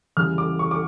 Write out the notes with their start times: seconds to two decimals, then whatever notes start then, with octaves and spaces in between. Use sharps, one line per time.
0.17 E2 C#3 E3 G3 F6
0.38 D6
0.59 C#6
0.71 D6